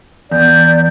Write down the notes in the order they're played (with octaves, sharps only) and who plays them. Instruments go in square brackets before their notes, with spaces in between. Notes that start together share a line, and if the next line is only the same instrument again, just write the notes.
[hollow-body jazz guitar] E2 [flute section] D5 G6